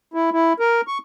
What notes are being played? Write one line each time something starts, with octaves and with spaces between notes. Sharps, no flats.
E4
E4
A#4
C#6